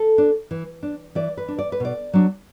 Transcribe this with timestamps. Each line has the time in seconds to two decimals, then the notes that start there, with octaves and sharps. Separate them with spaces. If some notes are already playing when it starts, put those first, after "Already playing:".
Already playing: A4
0.18 D4
0.51 E3
0.83 D4
1.15 E3 D5
1.38 B4
1.48 D4
1.59 D5
1.72 B4
1.80 B2 D5
2.13 F#3 D4